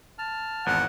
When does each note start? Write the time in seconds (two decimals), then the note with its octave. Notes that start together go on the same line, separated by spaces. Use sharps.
0.19 A5 F6
0.66 G#1 E2 F#5